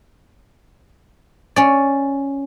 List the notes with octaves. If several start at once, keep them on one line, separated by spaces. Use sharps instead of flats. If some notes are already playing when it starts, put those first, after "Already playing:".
C#4 D5